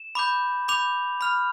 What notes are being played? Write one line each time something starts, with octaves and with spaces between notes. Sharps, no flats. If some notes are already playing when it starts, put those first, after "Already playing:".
Already playing: E7
B5 D6 G6
B5 D6 G6 F7
B5 F6